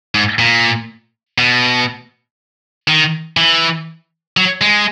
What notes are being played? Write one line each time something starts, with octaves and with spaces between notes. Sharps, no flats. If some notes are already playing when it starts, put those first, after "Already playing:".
G#2
A#2
B2
D#3
E3
F#3
G#3